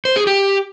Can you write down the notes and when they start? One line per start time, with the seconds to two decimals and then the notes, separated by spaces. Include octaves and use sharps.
0.05 C5
0.16 G#4
0.27 G4